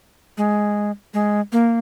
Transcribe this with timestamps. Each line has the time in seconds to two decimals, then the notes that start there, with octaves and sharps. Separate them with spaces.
0.37 G#3
1.14 G#3
1.52 A#3